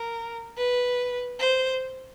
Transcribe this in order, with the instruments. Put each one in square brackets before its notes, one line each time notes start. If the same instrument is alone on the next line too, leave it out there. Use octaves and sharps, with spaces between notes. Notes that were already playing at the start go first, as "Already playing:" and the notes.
Already playing: [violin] A#4
B4
C5